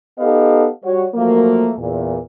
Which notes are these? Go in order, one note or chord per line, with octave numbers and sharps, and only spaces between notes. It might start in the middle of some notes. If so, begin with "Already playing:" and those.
B3 D#4 G4 A4 D#5 F5
G3 F#4 C#5
F3 F#3 A3 A#3
E2 A#2